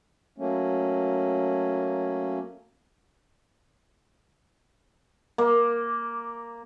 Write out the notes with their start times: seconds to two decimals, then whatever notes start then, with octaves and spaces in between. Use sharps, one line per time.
0.38 F#3 A3 A#3 C#4
5.38 A#3